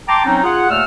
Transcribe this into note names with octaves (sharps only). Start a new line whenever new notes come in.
G5 A5 A#5 C6 D6
F#3 C4 C#4 D#4
F4 G#4 F#5
D#2 A#2 A3 F#5 E6 F6